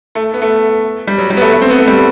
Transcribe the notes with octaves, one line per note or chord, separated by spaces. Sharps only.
A3
B3
A3
G3
F#3
G3
B3
A3
A3
C4
B3
A3
G3